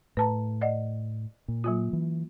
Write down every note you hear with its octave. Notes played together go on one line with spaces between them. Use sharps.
A2 B4 A5 A#5
D5 D#5 F#5
A#2
F#3 A#3 F4
E3